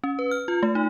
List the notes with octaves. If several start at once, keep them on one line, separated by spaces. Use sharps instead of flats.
C#4
B4
F6
F4
A3
D#4